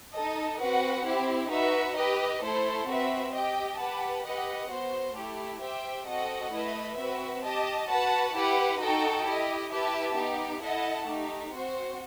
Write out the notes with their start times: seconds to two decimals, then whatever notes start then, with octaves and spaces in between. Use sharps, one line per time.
0.14 D#4 A4 D#5
0.59 C4 F#4 B4 F#5
1.05 C4 E4 G4
1.50 D#4 F#4 B4 E5
1.96 G4 B4 D#5
2.41 A3 E4 A4 C5
2.87 C4 F#4 B4 E5
3.33 G4 D#5 G5
3.78 G4 B4 F#5 A5
4.23 G4 B4 D#5 F#5
4.69 B3 F#4 C5
5.15 A3 E4 G4
5.60 G4 C5 E5 G5
6.06 C4 F#4 A4 D#5 F#5
6.52 A3 E4 B4 D#5
6.97 C4 F#4 B4 E5
7.43 G4 D#5 A5
7.88 F#4 B4 F#5 A5
8.34 E4 G4 B4 F#5
8.79 D#4 F#4 A4 D#5 G5
9.24 E4 G4 D#5
9.70 E4 G4 B4 E5 A5
10.16 B3 D#4 G4
10.61 E4 A4 D#5 F#5 A5
11.07 A3 D#4 G4
11.52 C4 F#4 C5